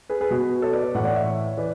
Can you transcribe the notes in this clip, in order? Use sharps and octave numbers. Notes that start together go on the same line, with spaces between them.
G#4 B4
G#4 B4
B2
A4 C#5
B4 D5
B4 D5
A2 E3 D5 F#5
D5 F#5
C#5 E5
E3 B4 D5